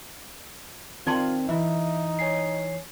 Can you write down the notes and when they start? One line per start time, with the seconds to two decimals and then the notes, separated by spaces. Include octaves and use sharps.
1.07 D#3 C4 F4 D5 A5 C6
1.49 E3 D#4 E5
2.19 C#5 G#5 C7